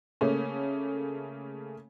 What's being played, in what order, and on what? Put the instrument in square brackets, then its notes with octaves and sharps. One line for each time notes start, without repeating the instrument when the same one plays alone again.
[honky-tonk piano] C#3 A3 A#3 C#4